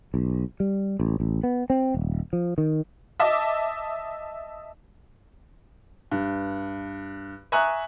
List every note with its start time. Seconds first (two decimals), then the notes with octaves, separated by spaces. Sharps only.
0.14 B1
0.60 G3
1.00 A1
1.20 A1
1.43 B3
1.70 C4
1.94 D#1
2.33 F3
2.58 D#3
3.20 D#5 E5 A5 D6
6.11 G2
7.52 E5 G#5 A#5 C#6 D#6 F#6